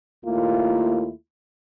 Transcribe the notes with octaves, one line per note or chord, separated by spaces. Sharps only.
D#2 A3 A#3 E4 F4